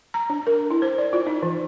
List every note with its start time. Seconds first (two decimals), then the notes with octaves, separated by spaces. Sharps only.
0.14 A#5
0.30 D4
0.47 A#4
0.71 E4
0.82 C5
0.98 D5
1.13 F4
1.27 D#4
1.43 E3